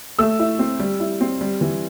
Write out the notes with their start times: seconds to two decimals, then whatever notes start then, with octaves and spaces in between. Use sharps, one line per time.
0.19 A3 E6
0.39 E4
0.59 C4
0.80 G3
1.00 E4
1.21 C4
1.41 G3
1.61 E3